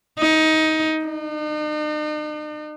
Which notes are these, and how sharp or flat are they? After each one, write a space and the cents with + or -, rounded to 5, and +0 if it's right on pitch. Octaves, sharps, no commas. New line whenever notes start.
D#4 +20
D#4 -45